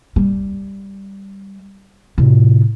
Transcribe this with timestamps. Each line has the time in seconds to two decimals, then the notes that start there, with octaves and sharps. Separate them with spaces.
0.16 G3
2.18 A2 C3